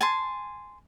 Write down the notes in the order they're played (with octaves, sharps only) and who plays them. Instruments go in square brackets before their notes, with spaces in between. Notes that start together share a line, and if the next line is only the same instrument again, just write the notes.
[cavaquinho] G#5 A5 C6